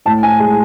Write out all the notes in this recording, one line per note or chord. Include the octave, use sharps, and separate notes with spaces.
A2 A5
G#5
G#3 G#5